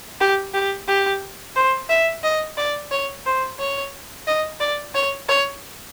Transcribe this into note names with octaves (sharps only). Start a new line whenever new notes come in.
G4
G4
G4
C5
E5
D#5
D5
C#5
C5
C#5
D#5
D5
C#5
C#5